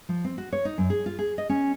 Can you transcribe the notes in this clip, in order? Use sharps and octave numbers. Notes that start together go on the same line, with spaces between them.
F3
C4
F#4
C#5
D#4
F#2
G#4
F4
G#4
D#5
C#4